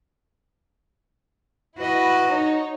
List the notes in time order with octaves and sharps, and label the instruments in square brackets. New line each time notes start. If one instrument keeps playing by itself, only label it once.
[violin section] E4 B4 [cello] F#4 D#5
[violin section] D#4 C#5